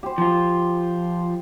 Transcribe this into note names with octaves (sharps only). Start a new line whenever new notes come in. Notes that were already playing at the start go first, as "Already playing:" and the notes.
G4 C5
F3 F4